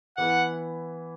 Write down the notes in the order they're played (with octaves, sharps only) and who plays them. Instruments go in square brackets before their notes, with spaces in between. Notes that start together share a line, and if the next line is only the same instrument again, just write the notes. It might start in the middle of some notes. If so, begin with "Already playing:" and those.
[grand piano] E3 B3 E4 B4 [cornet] F#5